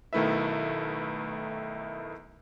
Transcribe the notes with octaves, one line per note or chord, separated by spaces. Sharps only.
B1 D#3 A3 E4 B4 E5